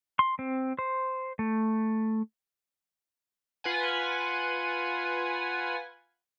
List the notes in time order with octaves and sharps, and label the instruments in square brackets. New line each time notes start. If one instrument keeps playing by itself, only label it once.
[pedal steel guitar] C6
C4
C5
A3
[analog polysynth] F4 B4 F#5 G#5